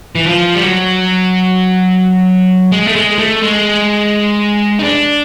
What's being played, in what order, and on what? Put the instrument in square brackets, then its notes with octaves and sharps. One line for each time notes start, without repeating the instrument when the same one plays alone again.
[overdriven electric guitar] E3
F3
G3
F#3
G#3
A3
G#3
A3
G#3
D#4
D4